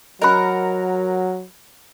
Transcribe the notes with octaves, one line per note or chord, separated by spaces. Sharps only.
F#3 A#4 D#5 F#5 B5